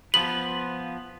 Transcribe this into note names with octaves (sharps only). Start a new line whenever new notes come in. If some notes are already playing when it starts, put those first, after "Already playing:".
F3 B3 B4 F#7